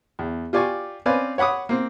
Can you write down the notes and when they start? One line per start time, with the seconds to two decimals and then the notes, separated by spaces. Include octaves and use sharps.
0.19 E2
0.53 F4 G4 D5 G#5 C#6
1.06 C4 C#4 B4 D5 F5 G#5
1.38 C#5 F#5 B5 D6 D#6
1.69 A#3 C4